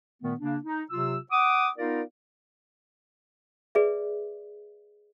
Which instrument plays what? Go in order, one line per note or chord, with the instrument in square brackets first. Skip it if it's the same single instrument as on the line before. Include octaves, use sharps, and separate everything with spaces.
[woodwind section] A#2 D#3 A3 B3
C#3 A#3 D4
D#4
C3 F#3 F4 E6
F#5 D6 D#6
B3 D#4 F4 A#4 D5 F5
[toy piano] G#4 B4 D5 E5